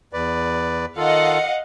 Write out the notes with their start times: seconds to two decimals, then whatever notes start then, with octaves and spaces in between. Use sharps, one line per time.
0.13 E2 B4 D5
0.97 D#3 F4 A4 D#5 F5 F#5